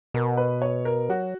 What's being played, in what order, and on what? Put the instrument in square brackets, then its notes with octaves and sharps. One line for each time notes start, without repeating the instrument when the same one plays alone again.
[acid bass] B2 [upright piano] A#4
[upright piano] B4
C#5
A#4
[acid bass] F#3 [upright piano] F#4